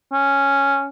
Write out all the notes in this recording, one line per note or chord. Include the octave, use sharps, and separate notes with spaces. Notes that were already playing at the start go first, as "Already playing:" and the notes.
C#4